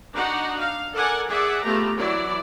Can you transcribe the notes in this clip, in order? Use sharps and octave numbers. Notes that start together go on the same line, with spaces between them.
D4 D#4 F#4 F#5 A#5
F5
A4 A#4 D5 F#5 G#5
G#4 D5 E5 F#5
A3 B3 F4 G4 A#5
E3 F#3 E4 D5